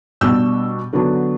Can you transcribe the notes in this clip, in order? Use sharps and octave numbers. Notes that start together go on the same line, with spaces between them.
B2 G3 D4 E6 G6
D3 F#3 B3 D4